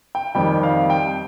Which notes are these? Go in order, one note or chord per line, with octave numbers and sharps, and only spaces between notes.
G5
F2 D#3 G3 G5
F5
G5